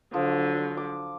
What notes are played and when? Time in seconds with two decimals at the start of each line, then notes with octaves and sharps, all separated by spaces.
0.14 D3 F3 F#3
0.77 D6